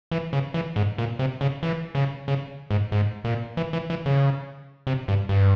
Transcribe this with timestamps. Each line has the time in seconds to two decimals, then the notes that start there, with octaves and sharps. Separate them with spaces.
0.12 E3
0.33 C#3
0.54 E3
0.76 G#2
0.98 A#2
1.19 C3
1.41 C#3
1.63 E3
1.95 C#3
2.28 C#3
2.71 G#2
2.92 G#2
3.24 A#2
3.57 E3
3.73 E3
3.90 E3
4.06 C#3
4.87 C3
5.08 G2
5.29 G2